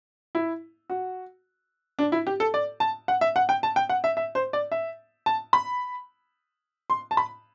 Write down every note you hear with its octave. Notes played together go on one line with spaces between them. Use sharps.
E4
F#4
D4
E4
G4
A4
D5
A5
F#5
E5
F#5
G5
A5
G5
F#5
E5
E5
C5
D5
E5
A5
B5
C6
A5
B5